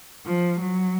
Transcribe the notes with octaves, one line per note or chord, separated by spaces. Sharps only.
F3
F#3